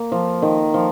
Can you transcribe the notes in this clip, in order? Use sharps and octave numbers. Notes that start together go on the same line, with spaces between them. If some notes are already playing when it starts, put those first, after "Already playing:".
Already playing: A#3
F3
D#3
F3